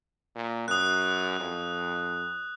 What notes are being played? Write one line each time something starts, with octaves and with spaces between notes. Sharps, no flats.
A#2
F#2 D#6 F#6
F2